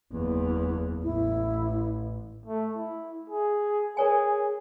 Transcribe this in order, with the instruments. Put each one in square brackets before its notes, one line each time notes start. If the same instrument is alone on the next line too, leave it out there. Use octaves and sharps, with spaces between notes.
[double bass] F#1 E2
[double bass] A1 [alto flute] E4
[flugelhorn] A3
E4
G#4
[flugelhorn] G#4 [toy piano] A#4 C#5 G#5